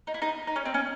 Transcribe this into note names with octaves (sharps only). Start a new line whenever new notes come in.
D#4
E4
D#4
D#4
C#4
C4
C#4